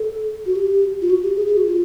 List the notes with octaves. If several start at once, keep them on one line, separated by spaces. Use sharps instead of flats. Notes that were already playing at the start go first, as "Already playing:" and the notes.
Already playing: A4
F#4
G4
F4
F#4
G4
G#4
G#4
F#4
F4